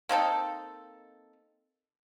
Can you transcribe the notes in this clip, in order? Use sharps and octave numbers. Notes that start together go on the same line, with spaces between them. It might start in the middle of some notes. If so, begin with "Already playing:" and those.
A#3 C4 D#4 A4